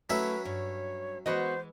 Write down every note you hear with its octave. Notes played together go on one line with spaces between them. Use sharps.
F#3 A3 C#4 E4 B4 E5 F5
G2 C#5
E3 G#3 B3 F#4 C5 D#5